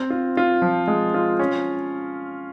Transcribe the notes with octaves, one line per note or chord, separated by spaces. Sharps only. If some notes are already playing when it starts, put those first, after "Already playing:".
Already playing: C4
F4
F4
F3
G#3
F4
C#4